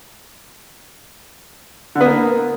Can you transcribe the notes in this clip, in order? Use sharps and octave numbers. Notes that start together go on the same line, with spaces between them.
D3
B3
A#3